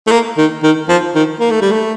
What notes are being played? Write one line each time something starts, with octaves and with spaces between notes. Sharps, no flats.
A3
A#3
D#3
D#3
F3
D#3
A#3
A3
G3
A3